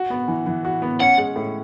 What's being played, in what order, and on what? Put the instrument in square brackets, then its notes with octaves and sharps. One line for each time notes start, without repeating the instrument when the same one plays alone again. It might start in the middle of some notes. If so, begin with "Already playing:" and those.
Already playing: [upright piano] F#4
B3
E3
E3
F#4
B3
[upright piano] C#4 [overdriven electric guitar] F#5
[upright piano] G#3
A2